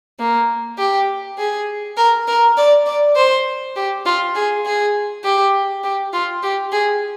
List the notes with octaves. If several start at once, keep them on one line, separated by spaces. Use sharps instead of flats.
A#3
G4
G#4
A#4
A#4
D5
D5
C5
G4
F4
G#4
G#4
G4
G4
F4
G4
G#4